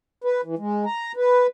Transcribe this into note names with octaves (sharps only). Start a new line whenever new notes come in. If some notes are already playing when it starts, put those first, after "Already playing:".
B4
E3
G#3
A#5
B4